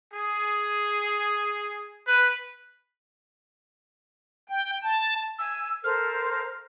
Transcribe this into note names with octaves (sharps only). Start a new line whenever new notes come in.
G#4
B4
G5
A5
G#5 E6
A4 A#4 C5 F6